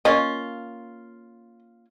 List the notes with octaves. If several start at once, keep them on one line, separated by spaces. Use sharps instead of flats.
A#3 C#4 F4 D#5